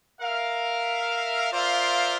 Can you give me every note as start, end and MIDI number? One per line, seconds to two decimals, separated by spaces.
0.21 1.48 70
0.21 1.48 76
0.21 1.48 77
1.51 2.16 65
1.51 2.16 70
1.51 2.16 72
1.51 2.16 74
1.51 2.16 76
1.51 2.16 77